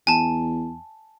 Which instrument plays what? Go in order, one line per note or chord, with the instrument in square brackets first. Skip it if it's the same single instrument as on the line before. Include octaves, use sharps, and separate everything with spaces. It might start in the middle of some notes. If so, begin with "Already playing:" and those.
[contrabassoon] E2 [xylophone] G#5 A5